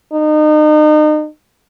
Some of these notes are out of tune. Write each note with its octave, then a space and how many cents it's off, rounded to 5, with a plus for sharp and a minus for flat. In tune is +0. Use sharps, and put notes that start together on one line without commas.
D#4 -35